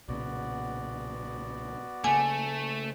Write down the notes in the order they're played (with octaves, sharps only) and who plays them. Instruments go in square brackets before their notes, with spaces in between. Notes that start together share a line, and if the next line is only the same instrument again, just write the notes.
[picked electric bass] B1 A#2 C#3 [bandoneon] B3 F#4 D5
[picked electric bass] C#3 A#3 [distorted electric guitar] A3 [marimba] G#5